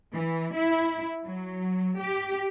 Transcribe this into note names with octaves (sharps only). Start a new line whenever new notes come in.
E3
E4
F#3
G4